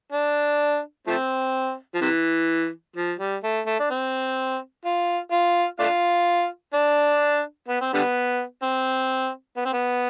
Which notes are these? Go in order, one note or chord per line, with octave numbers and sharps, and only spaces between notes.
D4
F3 A3 C4
F3
C3 E3
F3
G3
A3
A3
D4
C4
F4
F4
A3 D4 F4
D4
B3
C4
D3 G3 B3
C4
B3
C4
B3